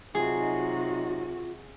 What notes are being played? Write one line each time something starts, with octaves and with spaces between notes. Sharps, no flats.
C3 F#3 D#4 F4 F#4 G#4